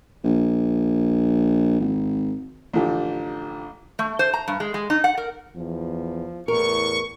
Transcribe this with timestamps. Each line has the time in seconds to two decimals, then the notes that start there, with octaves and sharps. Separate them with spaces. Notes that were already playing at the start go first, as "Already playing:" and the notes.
0.24 A#1
1.80 G#1
2.73 A1 D3 F3 G4
3.99 A3
4.19 C5
4.34 A#5
4.48 G2
4.60 G#3
4.74 G#3
4.90 D#4
5.04 F#5
5.18 A#4
5.56 E2 F3
6.48 E2 A2 A#4 C#6